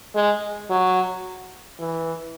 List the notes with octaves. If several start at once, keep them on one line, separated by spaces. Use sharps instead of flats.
G#3
F#3
E3